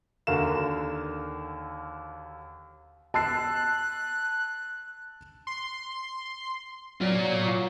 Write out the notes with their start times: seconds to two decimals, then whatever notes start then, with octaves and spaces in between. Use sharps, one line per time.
0.27 D#2 D3 F#4 A#4 F5 E7
3.14 A5 E6 F#6 C7
5.47 C6
7.01 F#3 F4 D5